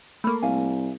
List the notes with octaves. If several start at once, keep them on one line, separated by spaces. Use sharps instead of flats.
A3 A#3 B5
C2 E5 F5 G#5